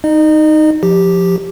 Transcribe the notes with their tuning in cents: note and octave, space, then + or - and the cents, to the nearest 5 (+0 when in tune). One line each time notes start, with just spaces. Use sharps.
D#4 +0 D#5 -35
F3 +10 G4 +0